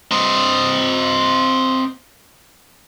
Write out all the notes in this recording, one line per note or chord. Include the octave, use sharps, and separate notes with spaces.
C4 D#5